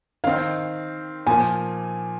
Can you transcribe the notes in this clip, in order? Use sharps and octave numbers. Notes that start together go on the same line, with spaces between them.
D#3 C4 D#4 F5
A#2 F3 A#3 G#5